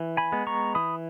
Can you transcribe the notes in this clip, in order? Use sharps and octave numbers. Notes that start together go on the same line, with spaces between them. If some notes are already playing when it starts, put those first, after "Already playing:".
Already playing: E3
G#5 B5
G#3 B3
A#5 C#6
E3 B5 D#6